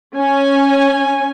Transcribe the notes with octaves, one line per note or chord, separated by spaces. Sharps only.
C#4 G#5